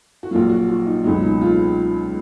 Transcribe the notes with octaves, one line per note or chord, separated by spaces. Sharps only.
F#4
A#1 A#2 F#3 F4
F#4
F#4
D#4
C#2 B2 F#3 D#4
D#4
F4